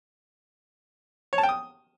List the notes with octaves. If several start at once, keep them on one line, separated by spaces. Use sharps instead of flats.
C#5
A5
G5
D#6